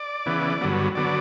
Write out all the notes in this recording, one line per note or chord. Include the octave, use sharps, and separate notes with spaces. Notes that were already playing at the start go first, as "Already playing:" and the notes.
Already playing: D5
C#3 E3 B3
G2 D3 F#3 B3
D3 F#3 B3 D5